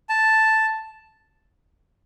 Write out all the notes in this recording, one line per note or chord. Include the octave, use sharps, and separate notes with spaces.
A5